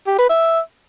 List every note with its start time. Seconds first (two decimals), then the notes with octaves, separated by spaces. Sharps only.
0.07 G4
0.18 B4
0.29 E5